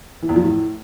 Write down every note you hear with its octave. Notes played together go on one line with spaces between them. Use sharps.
E3
E2
F3
A2